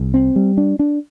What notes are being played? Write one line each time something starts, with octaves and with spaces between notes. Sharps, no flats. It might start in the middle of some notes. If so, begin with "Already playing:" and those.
Already playing: C2
C4
G3
D4
D4